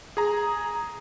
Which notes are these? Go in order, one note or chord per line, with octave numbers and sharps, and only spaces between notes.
G#4 A#5